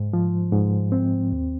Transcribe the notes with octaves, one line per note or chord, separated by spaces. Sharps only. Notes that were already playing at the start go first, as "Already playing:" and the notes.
Already playing: G#2
F3
G#2
C4
D#2